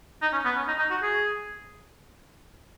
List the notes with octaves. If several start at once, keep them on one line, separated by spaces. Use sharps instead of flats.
D#4
C#4
B3
C#4
D#4
D#4
F#4
G#4